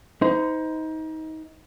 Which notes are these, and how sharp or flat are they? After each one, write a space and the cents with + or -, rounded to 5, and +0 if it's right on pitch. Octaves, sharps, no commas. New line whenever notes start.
D#4 +25 C5 -30